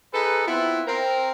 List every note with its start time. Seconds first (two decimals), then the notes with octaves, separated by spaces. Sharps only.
0.14 D#4 G#4 A4 B4
0.46 B3 C4 E4 F4
0.87 C4 A#4